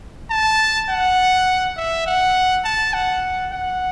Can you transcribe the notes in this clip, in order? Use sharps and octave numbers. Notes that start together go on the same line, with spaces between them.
A5
F#5
E5
F#5
A5
F#5
F#5